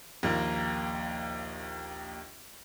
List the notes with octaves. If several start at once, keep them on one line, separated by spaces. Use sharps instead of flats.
A#1 D#2 A#3